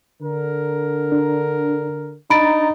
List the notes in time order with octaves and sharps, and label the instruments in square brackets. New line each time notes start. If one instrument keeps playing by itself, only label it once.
[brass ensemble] D3 A#4
[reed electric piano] D4
[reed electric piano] D4 A#5 A6 [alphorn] D#4 [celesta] B5 D7